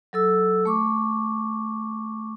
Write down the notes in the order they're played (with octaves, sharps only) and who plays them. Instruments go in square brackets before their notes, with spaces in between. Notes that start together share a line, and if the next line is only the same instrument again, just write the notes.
[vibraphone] F#3 A4 E6
A3 C#6 D6